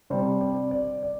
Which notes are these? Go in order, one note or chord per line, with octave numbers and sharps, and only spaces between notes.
C3 G3 D4 C5
D5
D5
D5